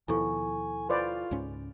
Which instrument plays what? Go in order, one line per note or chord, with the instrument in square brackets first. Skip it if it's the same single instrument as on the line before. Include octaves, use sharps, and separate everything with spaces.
[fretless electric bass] D#2 B2 F3 [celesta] E4 A4 C#6 [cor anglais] G#5
[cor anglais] F4 [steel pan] B4 C5 D5
[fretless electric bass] C#2 G#2 C#4